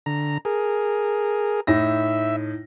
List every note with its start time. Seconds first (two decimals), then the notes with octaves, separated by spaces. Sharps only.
0.06 D3 A#5
0.45 G#4 A#4
1.67 A2 D#4 E5 A#6